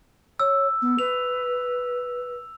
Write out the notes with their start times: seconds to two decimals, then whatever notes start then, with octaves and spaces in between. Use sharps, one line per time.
0.40 C#5 E6
0.82 B3
0.99 B4 F7